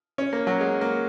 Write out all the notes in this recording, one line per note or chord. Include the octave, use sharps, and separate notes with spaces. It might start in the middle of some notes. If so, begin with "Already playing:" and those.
C#4
A#3
F#3
G#3
A#3